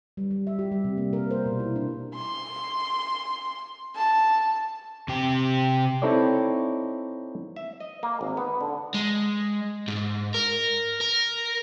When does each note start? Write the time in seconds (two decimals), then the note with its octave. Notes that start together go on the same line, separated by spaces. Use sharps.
0.17 G3
0.31 G3
0.47 E5
0.59 G4
0.72 G3
0.84 C3
0.97 A#3
1.13 A#4
1.31 C5
1.46 B2
1.60 E4
1.76 D4
2.15 C6
3.96 A5
5.08 C3 G4
6.02 C4 D#4 E4 A4 C#5 D5
7.56 E5
7.80 D#5
8.03 A#3
8.21 G#1
8.37 B3
8.61 D3
8.94 G#3
9.88 G#2
10.34 A#4
11.01 A#4